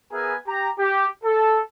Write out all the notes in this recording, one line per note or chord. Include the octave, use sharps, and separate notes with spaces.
B3 G#4 A#4 B4 E5 G#5
G4 A#5
G4
A4